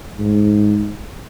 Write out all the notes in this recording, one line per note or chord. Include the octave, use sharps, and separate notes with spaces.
G#2